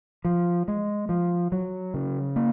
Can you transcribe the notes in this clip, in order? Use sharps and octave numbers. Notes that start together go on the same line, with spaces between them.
F3
G#3
F3
F#3
C#3
A#3